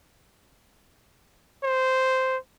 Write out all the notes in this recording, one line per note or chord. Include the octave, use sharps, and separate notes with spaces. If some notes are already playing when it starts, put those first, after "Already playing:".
C5